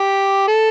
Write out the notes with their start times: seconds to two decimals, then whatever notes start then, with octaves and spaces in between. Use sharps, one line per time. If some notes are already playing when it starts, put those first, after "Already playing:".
Already playing: G4
0.48 A4